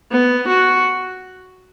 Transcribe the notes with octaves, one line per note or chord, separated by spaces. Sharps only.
B3
F#4